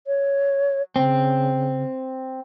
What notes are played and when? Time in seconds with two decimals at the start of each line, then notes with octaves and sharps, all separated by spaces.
0.07 C#5
0.96 C#3 C4